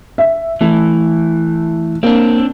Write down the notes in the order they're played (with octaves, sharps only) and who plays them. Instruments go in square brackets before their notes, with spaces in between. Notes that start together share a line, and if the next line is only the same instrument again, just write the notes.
[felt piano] E5
[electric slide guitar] E3 [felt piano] A3
[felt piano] A#3 [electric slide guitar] C4 D4